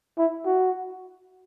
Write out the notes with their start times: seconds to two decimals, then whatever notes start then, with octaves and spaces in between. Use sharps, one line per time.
0.18 E4
0.46 F#4